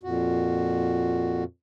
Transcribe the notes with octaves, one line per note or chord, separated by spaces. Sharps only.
F2 A#2 F#4